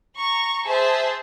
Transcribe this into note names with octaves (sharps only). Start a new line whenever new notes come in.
A#5 C#6
G#4 C5 E5 A5